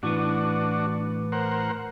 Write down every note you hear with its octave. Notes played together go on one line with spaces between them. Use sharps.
A2 E3 B3 D4 F#4
A#4 C5 F#5